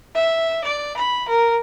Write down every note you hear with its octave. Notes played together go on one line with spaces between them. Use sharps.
E5
D5
B5
A#4